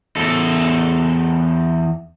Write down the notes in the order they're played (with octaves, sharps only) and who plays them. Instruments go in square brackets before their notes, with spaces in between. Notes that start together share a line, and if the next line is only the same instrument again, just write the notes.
[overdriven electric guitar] E2 A4